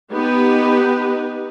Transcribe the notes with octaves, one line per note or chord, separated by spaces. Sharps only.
B3 D#4 G4 B4